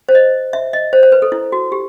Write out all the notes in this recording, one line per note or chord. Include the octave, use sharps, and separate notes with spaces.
C5
D#5
E5
D#5
C5
C5
B4
A4
E4
F#4
G4